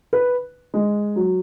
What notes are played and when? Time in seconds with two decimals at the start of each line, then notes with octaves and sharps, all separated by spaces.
0.13 B4
0.74 G#3
1.16 F#3